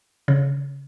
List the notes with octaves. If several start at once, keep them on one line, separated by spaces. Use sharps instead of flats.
C#3